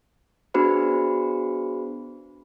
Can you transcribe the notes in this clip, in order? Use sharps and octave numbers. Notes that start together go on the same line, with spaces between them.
B3 D4 F#4 G#4 C5 B5